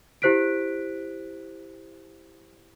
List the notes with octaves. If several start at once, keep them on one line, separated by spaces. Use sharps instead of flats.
E4 G4 C5 F#6 B6 D7